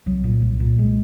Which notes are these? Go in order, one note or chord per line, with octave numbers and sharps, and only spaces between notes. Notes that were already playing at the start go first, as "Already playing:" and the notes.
C2 F#3
A#2
C2
A#2
C2 G#3